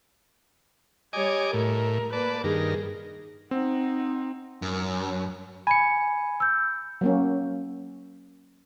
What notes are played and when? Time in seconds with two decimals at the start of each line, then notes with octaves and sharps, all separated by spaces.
1.13 G3 C#5 D#5 G#5 D6
1.53 A2 A#4
2.13 A#3 B4 D5 A5
2.44 G2 D#3 G#4 A#4
3.51 C4 D#4 F#5
4.62 F#2
5.67 G#5 B5 C#7
6.40 E6 G6
7.01 F#3 A#3 C#4